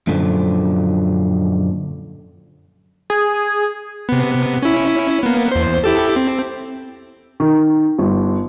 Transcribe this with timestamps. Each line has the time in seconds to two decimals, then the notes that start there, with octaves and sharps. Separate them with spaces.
0.07 F#2 A#2 D3 F3
3.10 G#4
4.09 C3 B3
4.63 C#4 E4
5.23 A#3 B3
5.52 E2 C5
5.84 E4 G4 A4
6.16 C4
7.40 D#3
7.99 G1